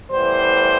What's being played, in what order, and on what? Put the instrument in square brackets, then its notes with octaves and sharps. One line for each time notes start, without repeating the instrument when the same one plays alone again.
[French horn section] A2 E3 G3 B3 C5